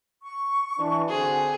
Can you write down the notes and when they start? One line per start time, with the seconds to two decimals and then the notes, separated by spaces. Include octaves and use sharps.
0.22 C#6
0.79 E3 D4
1.09 D3 C4 F#4 G#4